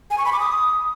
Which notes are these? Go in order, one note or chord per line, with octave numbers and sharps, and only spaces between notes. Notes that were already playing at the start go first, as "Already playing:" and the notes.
G#5
C#6
B5
D6
D#6